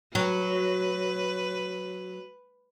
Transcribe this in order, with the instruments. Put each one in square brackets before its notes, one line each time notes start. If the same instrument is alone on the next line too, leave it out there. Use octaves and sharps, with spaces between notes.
[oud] F#3 [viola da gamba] B4